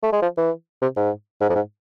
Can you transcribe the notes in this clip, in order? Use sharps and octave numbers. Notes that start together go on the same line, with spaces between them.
A3
G#3
F3
E3
C3
G#2
G#2
F2
G#2